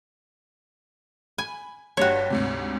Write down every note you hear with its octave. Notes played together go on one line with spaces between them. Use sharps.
G#5 B5
G1 G2 F#4 G4 C#5
D2 G#2 C3